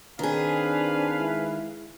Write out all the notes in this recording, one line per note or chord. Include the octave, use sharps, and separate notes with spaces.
D#3 C4 D4 G#4 B4 F5 G#5
G#3 E4